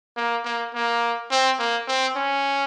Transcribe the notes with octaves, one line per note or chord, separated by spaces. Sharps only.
A#3
A#3
A#3
C4
A#3
C4
C#4